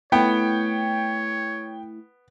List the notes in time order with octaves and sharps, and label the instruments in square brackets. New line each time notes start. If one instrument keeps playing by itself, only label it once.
[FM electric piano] A3 E4 [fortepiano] B3 [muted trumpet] C#5 [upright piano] G5